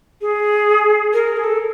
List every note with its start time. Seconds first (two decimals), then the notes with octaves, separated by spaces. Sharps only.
0.21 G#4
1.13 A#4
1.37 G#4
1.44 A4